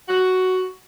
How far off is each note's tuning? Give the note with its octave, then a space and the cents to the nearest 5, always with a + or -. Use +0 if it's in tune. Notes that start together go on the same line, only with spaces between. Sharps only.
F#4 +5